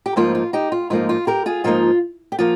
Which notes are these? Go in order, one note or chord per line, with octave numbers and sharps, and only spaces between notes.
G4
G#2 F3 A#3 D#4 F4
F4
D#4 G4
F4
G#2 F3 A#3 D#4 F4
F4
G4 A#4
F4 G#4
G#2 F3 A#3 D#4 F4
G4
F3 A#3 F4